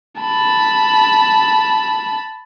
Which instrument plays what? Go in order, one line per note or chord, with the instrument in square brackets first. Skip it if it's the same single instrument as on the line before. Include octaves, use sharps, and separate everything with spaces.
[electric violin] A5 B5